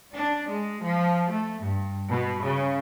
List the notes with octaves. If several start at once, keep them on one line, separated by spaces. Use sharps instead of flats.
D4
G#3
F3
A3
G2
B2
C#3